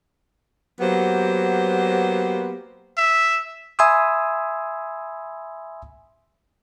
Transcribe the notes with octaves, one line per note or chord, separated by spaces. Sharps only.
F#3 A#3 B3 G4 C5
E5
E5 G#5 B5 C6 D#6 E6